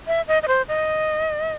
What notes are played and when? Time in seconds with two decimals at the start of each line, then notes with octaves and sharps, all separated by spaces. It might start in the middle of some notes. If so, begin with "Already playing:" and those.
0.07 E5
0.28 D#5
0.43 D#5
0.48 C5
0.68 D#5